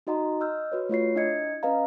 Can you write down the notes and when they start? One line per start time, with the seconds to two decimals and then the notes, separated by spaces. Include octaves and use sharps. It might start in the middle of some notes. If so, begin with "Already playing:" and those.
0.07 D#4 F#4 D#5 F#5 A#5 C6
0.41 D#5 E6 F6 G6
0.72 F#4 B4 C#5
0.89 A3 F4 C#5 C7
1.15 D4 E4 D#5 G#6 C#7
1.63 C#4 B4 D#5 F5 A#5